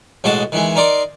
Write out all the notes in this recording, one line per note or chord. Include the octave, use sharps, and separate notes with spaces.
A1 B2 G#3 F#4 D#5 A5
D#3 E3 G#3
D#4 A#4 D5 A#5 C6